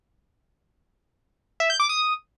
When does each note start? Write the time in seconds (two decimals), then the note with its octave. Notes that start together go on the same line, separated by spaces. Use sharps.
1.60 E5
1.70 G6
1.80 D6
1.89 D#6